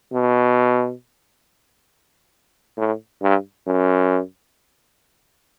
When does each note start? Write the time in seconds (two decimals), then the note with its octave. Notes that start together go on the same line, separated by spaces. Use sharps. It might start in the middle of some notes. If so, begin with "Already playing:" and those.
0.13 B2
2.78 A2
3.22 G2
3.67 F#2